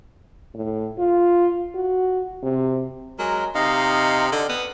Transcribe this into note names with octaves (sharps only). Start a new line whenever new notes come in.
A2
F4
F#4
C3
F#3 G#3 A#4
C3 D#4 D#5 F5
D3
B3